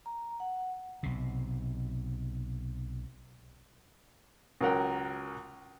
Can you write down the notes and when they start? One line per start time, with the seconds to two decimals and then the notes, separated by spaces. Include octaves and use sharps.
0.06 A#5
0.40 F#5
1.03 B1 C3
4.61 C#2 F#3 A#4 F#5 G5